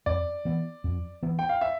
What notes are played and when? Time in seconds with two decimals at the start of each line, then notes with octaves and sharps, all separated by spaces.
0.06 F2 D5
0.45 E3 B3
0.84 F2
1.23 E3 B3
1.39 G5
1.49 F5
1.61 E5